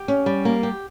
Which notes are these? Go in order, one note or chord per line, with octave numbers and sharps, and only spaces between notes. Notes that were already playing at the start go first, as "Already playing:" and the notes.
Already playing: G4
C#4
G3
A#3
G4